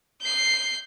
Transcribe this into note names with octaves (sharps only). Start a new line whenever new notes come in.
G6 C7